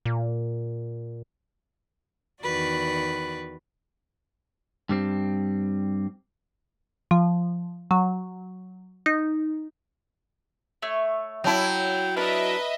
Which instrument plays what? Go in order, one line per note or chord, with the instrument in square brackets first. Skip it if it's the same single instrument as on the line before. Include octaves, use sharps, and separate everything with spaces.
[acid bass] A#2
[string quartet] E2 D#3 F#4 B4 D5
[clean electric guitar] G2 G3 C4
[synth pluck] F3
F#3
D#4
[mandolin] A3 C#5
[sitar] F#3 E4 [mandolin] D#5 A5 [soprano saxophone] G5
[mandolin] D4 A#4 [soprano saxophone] B4 [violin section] D#5 E5